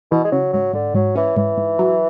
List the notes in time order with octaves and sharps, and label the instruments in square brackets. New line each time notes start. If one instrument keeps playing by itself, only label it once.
[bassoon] B2 [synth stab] E3
[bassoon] G#3
[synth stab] C#3 [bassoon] F#3
[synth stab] G#2 [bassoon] F#3
[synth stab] G#2 [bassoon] D3
[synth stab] G#2 [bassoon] F#3
[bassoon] E3 [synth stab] C#4
[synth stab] G#2 [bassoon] E3
[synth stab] G#2
F#3